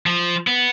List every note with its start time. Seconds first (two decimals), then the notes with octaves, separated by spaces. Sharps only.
0.06 F3
0.47 B3